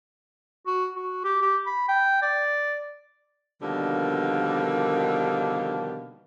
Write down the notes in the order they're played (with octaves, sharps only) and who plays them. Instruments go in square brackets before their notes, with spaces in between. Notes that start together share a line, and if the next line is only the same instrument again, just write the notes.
[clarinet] F#4
F#4
G4
G4
B5
G5
D5
[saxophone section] B2 D3 D#3 F3 G3 A#3